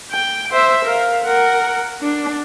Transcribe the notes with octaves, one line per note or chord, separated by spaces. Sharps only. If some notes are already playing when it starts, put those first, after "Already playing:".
G5
C5 E5
A#4 F5
A#4 F#5
D4